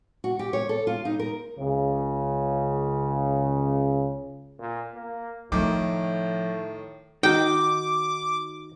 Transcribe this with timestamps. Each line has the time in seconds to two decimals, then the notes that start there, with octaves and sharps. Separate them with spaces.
0.24 F#4
0.39 G4
0.53 C#5
0.69 A4
0.87 F4
1.05 D#4
1.19 A#4
1.57 C#2 C#3
4.59 A#2
4.94 A#3
5.52 A2 D#3 F3 A3 D6
7.23 D#3 D#4 F#4 D#5 G5 D6